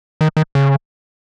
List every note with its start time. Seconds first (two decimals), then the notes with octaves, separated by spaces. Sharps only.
0.21 D#3
0.37 D#3
0.55 C#3